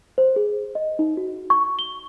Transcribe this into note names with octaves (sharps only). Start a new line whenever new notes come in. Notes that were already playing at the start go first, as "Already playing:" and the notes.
C5
G#4
D#5
D#4
F#4
C#6
G7